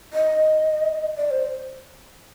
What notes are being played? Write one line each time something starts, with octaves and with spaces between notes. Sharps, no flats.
D#5
D5
C5